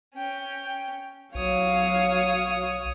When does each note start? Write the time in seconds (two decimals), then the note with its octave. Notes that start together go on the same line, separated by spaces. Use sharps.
0.15 C#4 G5
1.35 B1 F#3 C#5 F5 D#6